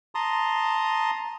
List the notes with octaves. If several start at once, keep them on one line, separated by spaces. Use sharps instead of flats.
A5 A#5 C6 D#6